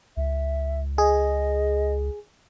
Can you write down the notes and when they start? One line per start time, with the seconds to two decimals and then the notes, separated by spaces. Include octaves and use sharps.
0.17 C#2 E5
0.98 G#4 D#5